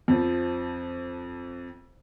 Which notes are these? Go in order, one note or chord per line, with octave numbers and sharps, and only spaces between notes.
F2 F3